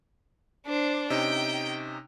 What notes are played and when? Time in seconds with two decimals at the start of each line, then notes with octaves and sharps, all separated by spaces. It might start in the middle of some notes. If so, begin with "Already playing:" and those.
0.67 D4 C5
1.10 C3 C#4 D#4 G5